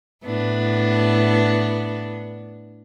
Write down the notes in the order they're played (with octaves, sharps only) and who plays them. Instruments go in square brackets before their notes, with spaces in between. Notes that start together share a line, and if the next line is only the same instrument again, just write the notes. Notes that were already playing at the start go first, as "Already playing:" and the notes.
[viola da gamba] A2 B3 D4